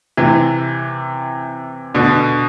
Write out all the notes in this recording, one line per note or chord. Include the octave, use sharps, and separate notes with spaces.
C3 E3
B2 D3